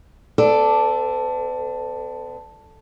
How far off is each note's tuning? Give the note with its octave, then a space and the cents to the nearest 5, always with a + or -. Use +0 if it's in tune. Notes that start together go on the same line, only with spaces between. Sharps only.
B3 +45 A4 +0 D5 +0